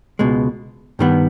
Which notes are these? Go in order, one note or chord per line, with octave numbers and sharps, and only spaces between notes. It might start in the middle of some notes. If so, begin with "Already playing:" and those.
C#2 B2 G#3
G2 D#3 G3 B3